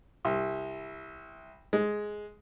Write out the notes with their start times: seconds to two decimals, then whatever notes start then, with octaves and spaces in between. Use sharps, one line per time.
0.25 C2
1.73 G#3